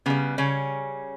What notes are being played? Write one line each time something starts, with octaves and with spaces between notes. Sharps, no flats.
C#3 G3 B3
C#3 C#4